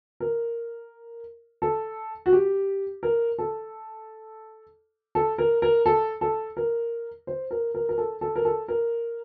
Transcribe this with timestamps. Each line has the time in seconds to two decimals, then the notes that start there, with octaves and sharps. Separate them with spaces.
0.20 A#4
1.62 A4
2.26 F#4
2.33 G4
3.03 A#4
3.39 A4
5.15 A4
5.38 A#4
5.62 A#4
5.86 A4
6.21 A4
6.57 A#4
7.27 C5
7.51 A#4
7.75 A#4
7.89 A#4
7.98 A4
8.21 A4
8.36 A#4
8.45 A4
8.68 A#4